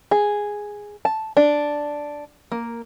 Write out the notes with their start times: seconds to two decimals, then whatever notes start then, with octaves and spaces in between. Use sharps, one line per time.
0.11 G#4
1.05 A5
1.37 D4
2.52 A#3